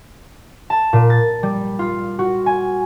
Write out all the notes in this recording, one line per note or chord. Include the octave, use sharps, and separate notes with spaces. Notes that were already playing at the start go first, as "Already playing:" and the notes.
A5
A#2
A6
G3
F4
F#4
G#5